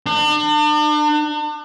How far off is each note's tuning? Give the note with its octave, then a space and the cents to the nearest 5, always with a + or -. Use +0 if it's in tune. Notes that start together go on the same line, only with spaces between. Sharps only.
D4 +40